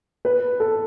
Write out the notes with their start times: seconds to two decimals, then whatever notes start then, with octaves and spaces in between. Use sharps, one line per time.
0.25 B4
0.60 A4